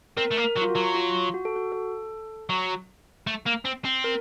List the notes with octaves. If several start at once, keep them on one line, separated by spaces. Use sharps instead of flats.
C4 A#4
A3
A#3
A#4
F#3
F4
F#4
F#3
F4
F#4
A4
F#4
A4
F#3
A3
A#3
C4
C4
A#4